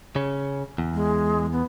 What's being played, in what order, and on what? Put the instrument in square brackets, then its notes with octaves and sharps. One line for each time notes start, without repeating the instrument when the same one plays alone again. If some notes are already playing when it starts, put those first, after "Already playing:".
[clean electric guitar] C#3 C#4
E2
[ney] G#3
B3